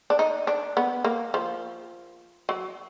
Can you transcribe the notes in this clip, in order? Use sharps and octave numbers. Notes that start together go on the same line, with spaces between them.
D4
D#4
D4
B3
A#3
F3
F#3